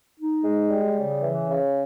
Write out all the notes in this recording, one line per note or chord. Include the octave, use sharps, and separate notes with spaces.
D#4
G#3
G3
C#3
E3
C#3